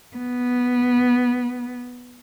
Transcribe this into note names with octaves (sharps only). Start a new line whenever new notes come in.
B3